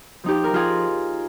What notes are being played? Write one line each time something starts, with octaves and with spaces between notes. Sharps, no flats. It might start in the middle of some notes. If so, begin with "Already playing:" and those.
F3 D#4 G4
A#4
F3 F4 G#4